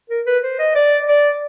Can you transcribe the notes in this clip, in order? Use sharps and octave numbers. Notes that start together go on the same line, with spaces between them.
A#4
B4
C5
D#5
D5
D5